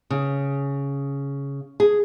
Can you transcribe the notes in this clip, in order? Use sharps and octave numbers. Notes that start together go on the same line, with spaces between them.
C#3
G#4